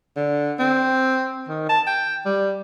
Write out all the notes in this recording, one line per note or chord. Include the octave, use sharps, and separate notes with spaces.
D3
C4
D#3
A5
G5
G3